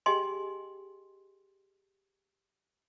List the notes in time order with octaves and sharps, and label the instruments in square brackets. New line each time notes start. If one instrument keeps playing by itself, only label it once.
[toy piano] G4 G#4 D#5 G5 G#5 C6